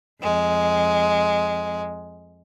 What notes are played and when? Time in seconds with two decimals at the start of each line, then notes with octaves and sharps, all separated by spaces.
0.20 F2 G#3